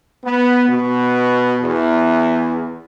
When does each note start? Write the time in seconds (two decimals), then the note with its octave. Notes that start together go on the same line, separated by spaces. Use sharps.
0.24 B3
0.68 B2
1.61 E2